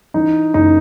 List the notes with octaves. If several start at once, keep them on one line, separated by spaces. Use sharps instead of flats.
E3 D#4
F#1 D#4